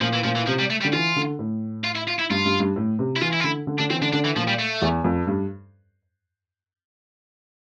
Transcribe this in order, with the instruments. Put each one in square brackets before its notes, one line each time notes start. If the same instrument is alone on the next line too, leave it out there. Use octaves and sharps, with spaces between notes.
[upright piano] A#2 [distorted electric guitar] F3
[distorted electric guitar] E3
[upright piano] A#2 [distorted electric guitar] F3
[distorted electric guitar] E3
[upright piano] C3 [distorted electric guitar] F3
[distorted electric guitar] G3
A3
G3
[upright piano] D3
[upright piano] E3 [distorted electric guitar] F4
[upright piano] D3
A2
[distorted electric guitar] F4
E4
F4
E4
[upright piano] G2 [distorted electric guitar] F4
[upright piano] G2
G2
A2
C3
[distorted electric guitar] E4
[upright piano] E3 [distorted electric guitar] F4
[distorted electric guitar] E4
F4
[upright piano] D3 [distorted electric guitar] E4
[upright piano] D3
[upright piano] D3 [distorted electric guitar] D4
[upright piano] E3 [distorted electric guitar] C4
[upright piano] D3 [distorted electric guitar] D4
[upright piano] D3 [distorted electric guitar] D4
[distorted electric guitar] E3
[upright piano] A#2 [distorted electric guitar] F3
[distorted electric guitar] G3
A3
[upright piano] E2
F2
G2